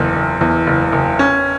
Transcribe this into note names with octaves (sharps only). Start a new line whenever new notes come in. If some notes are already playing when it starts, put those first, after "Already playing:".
Already playing: F#1 E2
F#1
E2
F#1
F#1
C#4